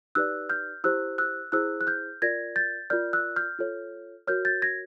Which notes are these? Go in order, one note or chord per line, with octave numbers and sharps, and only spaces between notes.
D#4 G4 B4 D5 E6 F#6
F6 G6
E4 G4 C5 E6 F#6
E6 F#6
E4 G#4 C5 E6 F#6
F#6
F6 G6
F4 A#4 D5 G#6 A#6
G6 A6
F4 A#4 D5 F6 G6
E6 F#6
F6 G6
F4 A4 C#5
F#4 A#4 C#5 F6 G6
G6 A6
G#6 A#6